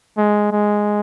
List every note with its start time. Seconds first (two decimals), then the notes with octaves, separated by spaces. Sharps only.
0.18 G#3
0.52 G#3